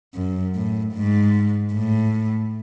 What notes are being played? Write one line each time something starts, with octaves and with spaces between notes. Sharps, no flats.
F#2
A2
G#2
A2